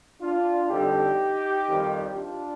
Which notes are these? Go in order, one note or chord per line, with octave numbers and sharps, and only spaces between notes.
D4 F4
F2 D3 G3 D#4 G4
F2 D#3 G3
D4 F4